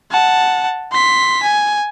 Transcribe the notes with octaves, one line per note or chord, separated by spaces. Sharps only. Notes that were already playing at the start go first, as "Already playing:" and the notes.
F#5 A5
C6 B6
G#5